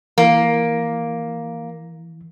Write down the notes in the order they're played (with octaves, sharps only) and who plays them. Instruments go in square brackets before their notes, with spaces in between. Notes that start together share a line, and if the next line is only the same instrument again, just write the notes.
[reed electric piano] E3 [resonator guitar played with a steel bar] A#3